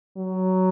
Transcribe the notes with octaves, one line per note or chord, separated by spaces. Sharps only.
F#3